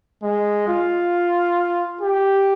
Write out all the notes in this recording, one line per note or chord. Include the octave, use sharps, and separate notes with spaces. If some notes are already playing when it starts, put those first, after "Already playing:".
G#3
F4
G4